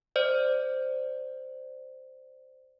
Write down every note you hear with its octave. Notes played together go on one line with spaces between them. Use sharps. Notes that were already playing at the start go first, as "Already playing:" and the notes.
C5 D5